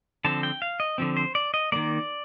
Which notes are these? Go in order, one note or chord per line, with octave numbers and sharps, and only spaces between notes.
D3 F3 C4 A5
G5
F5
D#5
D3 F3 C4
C5
D5
D#5
D#3 G3 A#3 D5